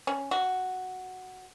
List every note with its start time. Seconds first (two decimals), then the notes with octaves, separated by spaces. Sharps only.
0.07 C#4
0.31 F#4